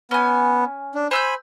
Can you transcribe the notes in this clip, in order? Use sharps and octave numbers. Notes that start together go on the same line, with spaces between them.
B3 C#4 G#5
D4
C5 G#5 B5 E6 G6